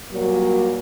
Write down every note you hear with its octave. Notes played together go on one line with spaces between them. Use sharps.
A#2 F#3 G3 A#3